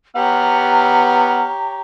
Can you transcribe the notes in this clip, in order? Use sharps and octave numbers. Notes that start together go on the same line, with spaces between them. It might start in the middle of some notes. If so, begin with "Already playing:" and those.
B3 G4 C#5 F#5 A#5 F6